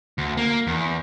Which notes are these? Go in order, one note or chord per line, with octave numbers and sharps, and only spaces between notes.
D2
A#3
E2